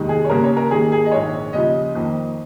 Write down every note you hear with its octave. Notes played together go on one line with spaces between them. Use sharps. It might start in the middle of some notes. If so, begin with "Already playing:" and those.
Already playing: F1 D#2 D#3 G#3
G#4
C#5
D#2 C#3 A#3 A#4
C#5
A#4
D#2 D#3 A#3 G#4
G#4
D#5
A#1 G#2 D#3 G#3 C#5
D#2 C#3 F3 D#5
F2 D#3 A#3